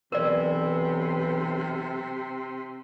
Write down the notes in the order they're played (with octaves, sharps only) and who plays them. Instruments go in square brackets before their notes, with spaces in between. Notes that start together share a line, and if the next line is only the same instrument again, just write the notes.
[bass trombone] B1 [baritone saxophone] C3 [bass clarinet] E3 [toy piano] A#4 D5